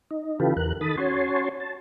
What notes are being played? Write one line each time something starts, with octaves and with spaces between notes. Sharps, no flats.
D#4
C#3 E3 F4 G4 A4 B4
E2 A#4 F#6
D#3 A4 B5 D#6 A6
C#4 F#4 C#5 G#5 A5 C6
A5